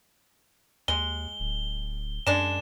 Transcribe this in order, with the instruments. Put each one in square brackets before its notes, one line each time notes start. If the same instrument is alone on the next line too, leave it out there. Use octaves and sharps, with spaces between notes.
[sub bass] D#2 [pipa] G#3 [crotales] G7
[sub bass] D1
[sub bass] F#2 [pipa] G#3 D4 [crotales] E7